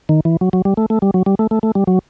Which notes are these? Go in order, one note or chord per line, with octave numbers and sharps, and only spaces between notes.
D#3
E3
F#3
F#3
G3
A3
A3
G3
F#3
G3
A3
A3
A3
G3
F#3